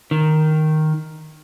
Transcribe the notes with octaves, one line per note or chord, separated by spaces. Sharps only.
D#3